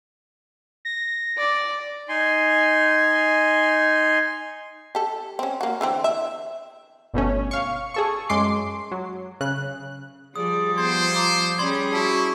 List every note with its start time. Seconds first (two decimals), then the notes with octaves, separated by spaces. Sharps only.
0.85 A#6
1.38 D5
2.09 D#4 G#5 C6
4.95 G4 A4
5.39 C4 C#4
5.61 A#3 F#4
5.81 D3 E3 C4
6.04 E5
7.14 G1 B2 A3 C#4
7.51 F5 C#6
7.94 G#4 A4 C#6
8.29 F#2 G#3 C6 D6 C7
8.92 F#3
9.41 C#3 F#6
10.36 F3 G3 G#4 D5 D#6
10.78 B3 C5 C6 G#6
11.16 F5 A#5 D6
11.58 G3 C#4 G#4 D5 B5 C6 G#6
11.93 E4 F#4 A5